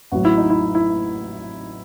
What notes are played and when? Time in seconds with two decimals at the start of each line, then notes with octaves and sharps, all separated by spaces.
0.12 A1 A2 F#3 F#4
0.25 E4
0.37 D#4
0.50 E4
0.75 E4